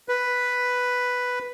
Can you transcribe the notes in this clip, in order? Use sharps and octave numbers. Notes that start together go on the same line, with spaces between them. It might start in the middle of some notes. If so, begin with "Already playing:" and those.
B4